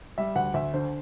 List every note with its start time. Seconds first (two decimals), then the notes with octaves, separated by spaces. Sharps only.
0.18 G3 E5
0.36 D2 F#5
0.54 D2 E5
0.74 D3 C5